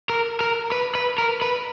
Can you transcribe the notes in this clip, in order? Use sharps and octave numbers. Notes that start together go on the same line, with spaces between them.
A#4
A#4
B4
B4
A#4
B4